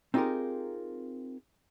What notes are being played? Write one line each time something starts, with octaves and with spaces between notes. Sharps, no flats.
C4 D#4 F4 G4 G#4 A#4